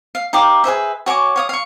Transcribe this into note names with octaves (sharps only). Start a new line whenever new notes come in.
F5
D#4 G4 F5 D6
G#4 B4 C5 E5
F#4 C#5 G#5 D6
C#5 F5 D#6
F5 C#6